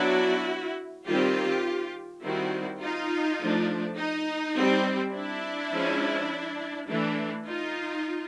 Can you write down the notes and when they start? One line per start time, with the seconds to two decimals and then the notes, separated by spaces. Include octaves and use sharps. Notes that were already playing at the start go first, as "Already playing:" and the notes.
Already playing: F#3 B3 D4 E4 F#4
1.07 D#3 G3 C4 F4 G4
2.24 D#3 G3 C4 E4 F#4
2.81 D#4 F4
3.40 F3 A3 D4
3.98 D#4
4.57 G3 C4
5.15 D4 E4
5.74 F3 G#3 C#4
6.90 E3 A3 D4
7.47 D#4 F4